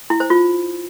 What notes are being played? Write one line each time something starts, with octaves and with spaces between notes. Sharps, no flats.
E4
C5
F4